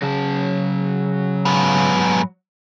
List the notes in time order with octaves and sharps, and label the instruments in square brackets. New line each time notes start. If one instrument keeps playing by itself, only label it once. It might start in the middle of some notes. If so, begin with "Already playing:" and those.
[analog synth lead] C#3 [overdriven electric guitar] F#3 A5
[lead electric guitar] G#2 B3